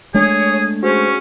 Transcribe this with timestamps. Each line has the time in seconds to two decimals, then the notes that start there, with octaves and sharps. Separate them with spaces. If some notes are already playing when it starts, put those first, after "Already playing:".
0.14 G#3 A3 D4 G#4 C#5
0.83 C#4 F#4 G#4 C5